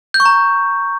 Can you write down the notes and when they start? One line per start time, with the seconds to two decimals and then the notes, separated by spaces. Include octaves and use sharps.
0.14 G6
0.20 C#6
0.26 A#5